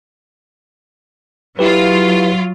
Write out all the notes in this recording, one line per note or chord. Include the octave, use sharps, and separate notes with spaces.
F#3 E4 F4 G4 B4